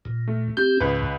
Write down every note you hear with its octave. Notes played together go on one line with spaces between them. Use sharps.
A#2
A3
C4 G4 G6
C#2 G#2 B4